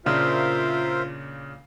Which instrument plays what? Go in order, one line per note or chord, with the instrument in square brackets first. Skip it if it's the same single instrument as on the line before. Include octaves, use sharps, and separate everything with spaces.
[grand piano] A#2 C#3 D4 [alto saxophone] F4 [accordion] A#4 C5 E5